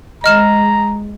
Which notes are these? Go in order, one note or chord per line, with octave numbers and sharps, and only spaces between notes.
G#3 D#5 A#5 F6 E7